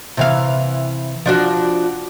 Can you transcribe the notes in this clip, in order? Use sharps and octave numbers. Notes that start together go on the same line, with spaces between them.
C3 E3 F5
F3 D4 F#4